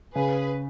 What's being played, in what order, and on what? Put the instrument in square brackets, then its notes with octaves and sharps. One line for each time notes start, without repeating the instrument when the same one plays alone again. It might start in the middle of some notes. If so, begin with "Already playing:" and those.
[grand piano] C#3 [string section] G#4 B4